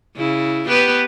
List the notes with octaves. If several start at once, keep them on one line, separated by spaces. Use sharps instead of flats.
C#3 E4
B3 G4 B4